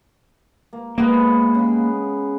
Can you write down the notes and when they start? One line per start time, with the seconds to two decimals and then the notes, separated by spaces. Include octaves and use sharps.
0.73 A#3
0.98 G#3 A#3 B3 B4
1.55 C#3 B5